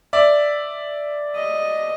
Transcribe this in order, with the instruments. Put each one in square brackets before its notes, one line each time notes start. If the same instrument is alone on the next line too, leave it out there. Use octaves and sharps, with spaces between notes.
[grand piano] D5 E5
[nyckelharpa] D#5